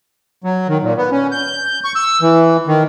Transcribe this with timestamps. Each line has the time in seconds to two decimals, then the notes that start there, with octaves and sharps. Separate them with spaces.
0.44 F#3
0.68 D#3
0.82 A#2
0.97 B3
1.12 C#4
1.32 G6
1.84 C#6
1.96 E6
2.22 E3
2.67 D#3